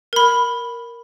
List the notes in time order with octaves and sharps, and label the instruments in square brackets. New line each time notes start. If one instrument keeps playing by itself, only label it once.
[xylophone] A#4 B5